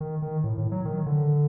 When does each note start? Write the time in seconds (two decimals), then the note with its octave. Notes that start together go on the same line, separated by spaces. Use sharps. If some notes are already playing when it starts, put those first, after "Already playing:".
0.01 D#3
0.22 D#3
0.44 A2
0.58 A2
0.72 F#3
0.85 D#3
1.06 D3